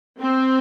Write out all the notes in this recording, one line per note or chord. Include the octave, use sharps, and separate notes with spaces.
C4